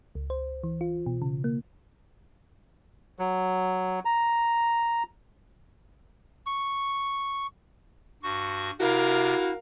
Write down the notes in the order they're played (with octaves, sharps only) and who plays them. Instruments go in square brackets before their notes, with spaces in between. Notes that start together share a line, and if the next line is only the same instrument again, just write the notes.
[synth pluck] C#2
C5
E3
F4
B2
C#3
A#3
[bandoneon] F#3
A#5
[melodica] C#6
[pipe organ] G2 F#4 C#6
[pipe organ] C3 [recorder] E4 [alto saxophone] F#4 [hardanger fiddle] A#4 F5